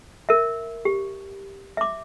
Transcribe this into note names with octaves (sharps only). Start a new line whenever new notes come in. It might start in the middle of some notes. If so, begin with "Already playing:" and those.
A#4 E5
G4
E5 D6